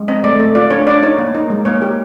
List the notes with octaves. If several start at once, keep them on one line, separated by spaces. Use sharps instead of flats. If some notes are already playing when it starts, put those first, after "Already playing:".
Already playing: G#3
C4 D#5
A3 D5
A3
F4 D5
D4 C#5
D4 D5
D#4 C#5
A#3
D#4
G#3
A#3 C#5
G4